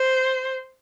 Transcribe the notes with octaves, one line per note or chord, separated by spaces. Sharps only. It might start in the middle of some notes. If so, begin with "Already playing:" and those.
Already playing: C5